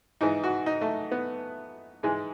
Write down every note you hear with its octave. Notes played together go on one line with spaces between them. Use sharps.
G#2 E3 D#4
F#4
D#4
A3
B3
G#2 E3 G#3